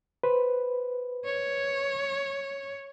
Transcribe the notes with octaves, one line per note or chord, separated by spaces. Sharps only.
B4 C5
C#5